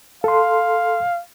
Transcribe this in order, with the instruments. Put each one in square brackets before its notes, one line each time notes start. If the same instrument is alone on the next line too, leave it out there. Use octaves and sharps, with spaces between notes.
[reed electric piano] A4 C6 [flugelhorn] F5